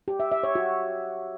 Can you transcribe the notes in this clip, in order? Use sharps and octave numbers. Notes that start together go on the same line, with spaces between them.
G4
E5
E5
C#5
F#4